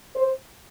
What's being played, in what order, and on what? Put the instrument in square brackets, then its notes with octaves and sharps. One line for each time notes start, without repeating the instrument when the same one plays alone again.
[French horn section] C5